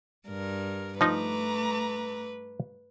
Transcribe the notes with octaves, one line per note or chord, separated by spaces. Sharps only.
G2 A#4
F3 A3 D#4 B4 A#5 D6